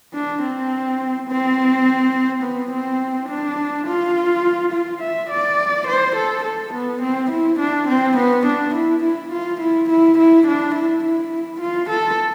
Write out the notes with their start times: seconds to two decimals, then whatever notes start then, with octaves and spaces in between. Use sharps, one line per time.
0.14 D4
0.42 C4
1.28 C4
2.43 B3
2.71 C4
3.29 D4
3.87 F4
4.72 F4
5.02 E5
5.30 D5
5.87 C5
6.16 A4
6.44 A4
6.74 B3
7.02 C4
7.31 E4
7.60 D4
7.88 C4
8.17 B3
8.46 D4
8.75 E4
9.04 E4
9.33 F4
9.61 E4
9.90 E4
10.19 E4
10.47 D4
10.75 E4
11.04 E4
11.61 F4
11.90 A4